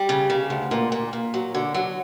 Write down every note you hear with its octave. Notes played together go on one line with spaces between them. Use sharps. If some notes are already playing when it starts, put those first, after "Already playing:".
Already playing: G3
C#3
C#3
D2
A#2
A#2
A#2
F#3
D3
F#3